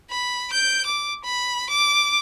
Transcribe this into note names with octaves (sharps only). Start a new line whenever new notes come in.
B5
G6 D7
D6
B5
D6